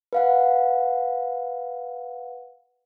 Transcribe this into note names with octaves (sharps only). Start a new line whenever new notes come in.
B4 F5 F#5